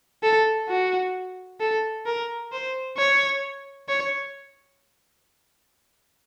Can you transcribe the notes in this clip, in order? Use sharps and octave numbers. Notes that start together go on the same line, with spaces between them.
A4
F#4
A4
A#4
C5
C#5
C#5